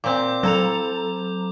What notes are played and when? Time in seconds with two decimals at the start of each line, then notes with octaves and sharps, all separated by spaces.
0.04 A#2 C4 D6 G6
0.43 F#3 A4 A#5 F7